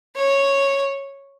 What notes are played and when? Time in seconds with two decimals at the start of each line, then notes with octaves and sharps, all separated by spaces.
0.16 C#5